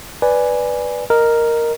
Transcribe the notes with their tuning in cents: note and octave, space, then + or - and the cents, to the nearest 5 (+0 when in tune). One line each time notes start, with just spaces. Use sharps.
B4 +0 D5 +0 G#5 +0
A#4 +0 D#5 -10